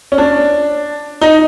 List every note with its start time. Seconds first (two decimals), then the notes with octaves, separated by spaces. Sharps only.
0.12 C#4
0.18 D4
1.21 D#4